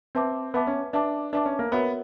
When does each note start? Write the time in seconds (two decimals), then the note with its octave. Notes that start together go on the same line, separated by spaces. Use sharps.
0.15 C4 B4 E5 A5 D6
0.54 B3 B4 E5 A5 D6
0.67 C#4
0.93 D4 B4 E5 A5 D6
1.33 D4 B4 E5 A5 D6
1.46 C#4
1.59 A#3
1.72 B3 F#4 A#4 C#5 E5